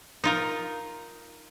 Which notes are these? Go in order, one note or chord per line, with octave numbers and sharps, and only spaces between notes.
D#4 F4 A#4